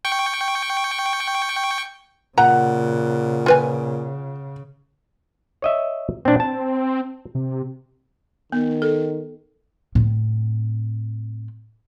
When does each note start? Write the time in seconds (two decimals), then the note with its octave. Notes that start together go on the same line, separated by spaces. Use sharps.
0.05 G5 C#6
2.38 A#2 C#3 F#5 A#5
3.46 F4 B4 G#5
5.62 C#5 D#5 E5
6.25 A#2 C4 D4
6.40 C4 A5
7.35 C3
8.52 D#3 B3
8.82 A4
9.95 A2 C4